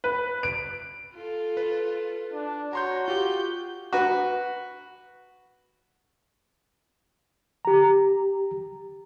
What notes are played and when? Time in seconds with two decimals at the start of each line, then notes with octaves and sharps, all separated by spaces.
0.04 B4
0.43 D7
1.15 F4 A4
1.57 B4
2.33 D4
2.73 F#4 C#5 A#5 C6 G6
3.08 F4 G4 G6
3.93 F#4 B4
7.65 G4 A#5